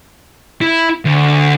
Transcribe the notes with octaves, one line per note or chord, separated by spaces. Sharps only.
E4
D2